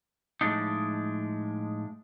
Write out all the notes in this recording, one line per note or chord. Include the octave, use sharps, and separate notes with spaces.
A2 F3 G#3 D4 D#4